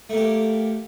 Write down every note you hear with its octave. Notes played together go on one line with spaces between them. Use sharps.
A3 A#3 G4